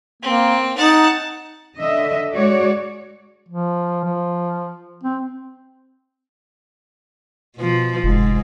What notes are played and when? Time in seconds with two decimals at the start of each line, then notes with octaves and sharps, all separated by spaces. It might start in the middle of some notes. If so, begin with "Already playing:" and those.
0.22 A#3 C4
0.77 D#4 F#5 A5
1.78 D3 D#5 E5
2.34 G#3 F#4 C#5 D5
3.49 F3
4.04 F3
5.03 C4
7.57 B2 F3
8.03 F1 G#2